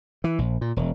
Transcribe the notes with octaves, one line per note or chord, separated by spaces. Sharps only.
E3
A#1
A#2
E1